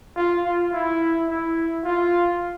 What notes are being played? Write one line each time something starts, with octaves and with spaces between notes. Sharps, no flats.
F4
F4
E4
E4
F4